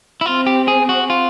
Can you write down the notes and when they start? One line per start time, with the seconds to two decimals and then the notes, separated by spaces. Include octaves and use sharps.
0.21 E4
0.26 C4 F4
0.47 G4
0.68 G#4
0.89 F#4
1.10 F4